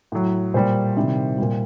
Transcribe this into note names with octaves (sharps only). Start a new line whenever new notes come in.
A2 F#3
A#2 G3 C5
C3 D#3 G3
A#2 G3